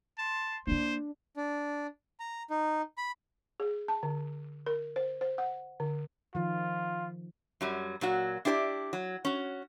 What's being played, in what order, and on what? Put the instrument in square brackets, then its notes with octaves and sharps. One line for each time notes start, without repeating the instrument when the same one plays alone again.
[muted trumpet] A5 [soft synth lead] C6
[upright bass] A#3 E4 [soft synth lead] D4 [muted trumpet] C5
[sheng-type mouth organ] D4
A#5
D#4
B5
[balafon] G#4
A5
D3
A#4
C5
C5
F#5
D3
[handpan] D#3 F3 [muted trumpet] F4
[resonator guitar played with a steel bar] F#2 F#3 G3
A#2 F#3 F#4
D4 E4 G4 C5 D5
F#3
C#4 F#4